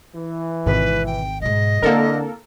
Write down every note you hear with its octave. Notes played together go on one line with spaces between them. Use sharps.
E3
G#1 B2 B4
G5
G#2 B2 D#5
D3 A#3 C4 E4 A4 A#4